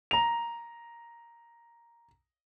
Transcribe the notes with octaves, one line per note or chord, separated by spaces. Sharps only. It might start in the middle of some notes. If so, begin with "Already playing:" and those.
A#5 F7